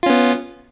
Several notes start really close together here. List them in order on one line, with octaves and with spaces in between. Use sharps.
F4 C#4 B3